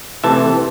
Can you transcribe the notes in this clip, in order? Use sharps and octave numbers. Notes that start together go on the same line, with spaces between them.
C3 E3 A3 C4 E5 A5